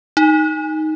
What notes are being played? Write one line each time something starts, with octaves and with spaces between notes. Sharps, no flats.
D#4